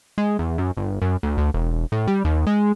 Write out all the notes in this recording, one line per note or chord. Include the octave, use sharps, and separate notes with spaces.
G#3
E2
F#2
G1
F#2
D2
D2
E1
A2
G3
D#2
G#3